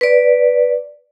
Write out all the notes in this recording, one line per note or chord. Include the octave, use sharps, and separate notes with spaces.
B4 D5